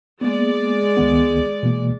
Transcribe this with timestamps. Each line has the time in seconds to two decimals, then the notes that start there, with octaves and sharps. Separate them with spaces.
0.21 G#3 A#3 B3 D5
0.97 C#2 D#3 B3
1.63 B2 E3 A#3